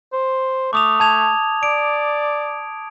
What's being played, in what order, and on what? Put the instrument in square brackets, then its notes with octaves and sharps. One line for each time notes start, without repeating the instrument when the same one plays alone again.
[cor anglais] C5
[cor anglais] A3 [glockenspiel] D6 D#6 F7
[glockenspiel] A5 G#6 F7
[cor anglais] D5 [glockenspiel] D7